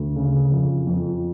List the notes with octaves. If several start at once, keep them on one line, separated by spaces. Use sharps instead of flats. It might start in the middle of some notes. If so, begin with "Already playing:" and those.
Already playing: D2
C#3
F2
F2